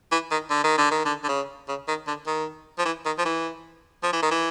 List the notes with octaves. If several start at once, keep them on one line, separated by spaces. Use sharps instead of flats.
E3
D#3
D3
D#3
D3
D#3
D3
D3
C#3
C#3
D#3
D3
D#3
F3
E3
D#3
F3
E3
F3
E3
D#3
E3